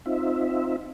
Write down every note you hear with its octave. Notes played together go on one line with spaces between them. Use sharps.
C4 D#4 F4 E5